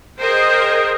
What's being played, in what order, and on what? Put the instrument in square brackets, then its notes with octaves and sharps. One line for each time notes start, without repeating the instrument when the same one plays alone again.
[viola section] G#4 A#4 C5 D#5 G5